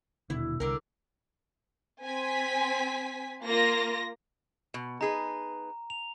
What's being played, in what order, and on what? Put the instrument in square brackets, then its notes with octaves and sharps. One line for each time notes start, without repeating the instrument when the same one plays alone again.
[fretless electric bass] D#1 B2 D3 [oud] E4
[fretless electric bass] C2 [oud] D3 A#4
[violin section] C4 G#5 B6
A#3 F4 A#6
[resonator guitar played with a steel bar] B2
[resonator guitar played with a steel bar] D#4 G#4 B4 [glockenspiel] A#5
[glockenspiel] F7